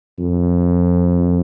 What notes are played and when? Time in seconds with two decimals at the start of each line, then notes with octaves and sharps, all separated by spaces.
0.19 F2